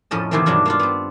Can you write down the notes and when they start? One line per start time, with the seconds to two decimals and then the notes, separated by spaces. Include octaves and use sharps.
0.11 F2 A2 F3 C#4 D#5 A5
0.31 C3 D#3 E3 A3 A#3 C4
0.46 G2 B2 F#3 D4 F4
0.65 A#3 D4 F4
0.79 B3 C4